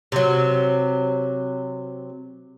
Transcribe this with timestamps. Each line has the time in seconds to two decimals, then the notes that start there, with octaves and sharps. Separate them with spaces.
0.12 C3 F#3